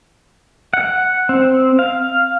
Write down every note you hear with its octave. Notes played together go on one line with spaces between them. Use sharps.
F#5
C4
F5